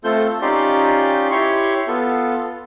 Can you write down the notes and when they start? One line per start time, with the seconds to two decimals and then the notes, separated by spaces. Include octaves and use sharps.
0.04 A3 C4 F4 A4 G6
0.42 C#4 D#4 F4 G4 D5 C6
1.31 E4 G4 C#5 C6 C#6
1.88 B3 F4 A4